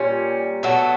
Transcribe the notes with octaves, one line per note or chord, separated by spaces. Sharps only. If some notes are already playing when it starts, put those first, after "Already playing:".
Already playing: A#2 G3 C#4
B2 F#3 A3